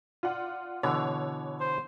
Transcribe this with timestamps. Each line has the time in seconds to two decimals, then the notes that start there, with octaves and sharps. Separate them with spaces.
0.23 F4 D5 F#5
0.83 B2 D3 E3 C#5
1.60 C5